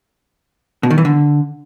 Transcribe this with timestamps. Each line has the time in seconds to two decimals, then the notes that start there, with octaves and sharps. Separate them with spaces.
0.83 B2
0.90 D#3
0.98 E3
1.05 D3